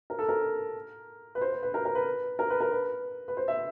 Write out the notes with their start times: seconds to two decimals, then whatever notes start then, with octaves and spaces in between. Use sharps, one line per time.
0.10 A#4
0.19 A4
0.29 A#4
1.35 B4
1.41 C5
1.52 B4
1.63 B4
1.74 A#4
1.85 A#4
1.95 B4
2.39 A#4
2.50 B4
2.60 A#4
2.71 B4
3.28 B4
3.37 C5
3.48 E5